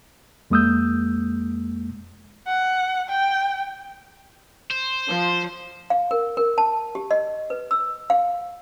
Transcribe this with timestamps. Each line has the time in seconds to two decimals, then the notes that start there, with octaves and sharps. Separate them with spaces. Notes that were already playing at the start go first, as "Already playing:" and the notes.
0.50 F2 G#3 A#3 D#6 E6 G6
2.47 F#5
3.09 G5
4.71 C5
5.07 F3
5.90 F5
6.11 A#4
6.37 A#4
6.58 A5
6.95 G4
7.11 D#5
7.50 B4
7.71 E6
8.10 F5